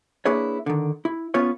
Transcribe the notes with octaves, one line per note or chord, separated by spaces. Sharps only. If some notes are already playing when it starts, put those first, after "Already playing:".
A#3 D4 E4 G#4 B4 C#5
D3 D#3
E4
B3 C#4 F4 B4 C#5